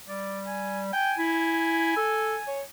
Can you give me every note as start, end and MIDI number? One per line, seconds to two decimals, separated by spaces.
0.08 0.91 55
0.08 0.41 74
0.46 0.82 80
0.93 1.12 79
0.93 2.63 80
1.18 1.96 64
1.97 2.37 69
2.47 2.62 73